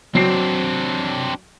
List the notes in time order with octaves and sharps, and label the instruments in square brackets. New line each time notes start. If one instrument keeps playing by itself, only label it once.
[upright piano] F#3 C7 [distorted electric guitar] C4 D4